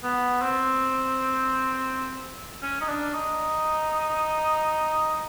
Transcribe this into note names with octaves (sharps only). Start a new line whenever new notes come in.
B3
C4
C#4
D#4
D4
D#4